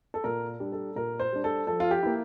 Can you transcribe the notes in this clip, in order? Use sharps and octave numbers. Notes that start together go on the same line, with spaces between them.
A4
A#2 A#4
G3 D4
A4
A#2 A#4
C5
G3 D4
A4
F3 A4
F4
G4
A#3 E4